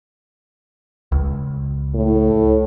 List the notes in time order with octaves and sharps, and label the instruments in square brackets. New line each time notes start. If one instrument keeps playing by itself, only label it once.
[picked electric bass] C#2
[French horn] A2